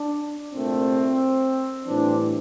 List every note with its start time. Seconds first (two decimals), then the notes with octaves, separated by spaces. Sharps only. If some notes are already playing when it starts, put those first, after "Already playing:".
Already playing: D4
0.53 C2 A#2 A3 C4
1.85 A2 E3 G3 C4 D4